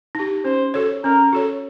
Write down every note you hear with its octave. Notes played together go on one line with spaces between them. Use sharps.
D#4 G4
C#4 C5
F#4 A4 C#5
C#4 A#4
F#4 A4 C#5